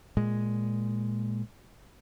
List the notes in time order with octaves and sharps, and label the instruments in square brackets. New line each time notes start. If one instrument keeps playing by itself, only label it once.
[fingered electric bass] A#2 G#3